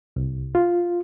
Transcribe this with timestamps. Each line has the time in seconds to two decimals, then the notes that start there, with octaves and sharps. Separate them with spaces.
0.16 C2
0.55 F4